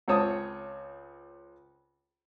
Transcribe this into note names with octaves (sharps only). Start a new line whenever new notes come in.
C#2 C4 C#5 A5 D#6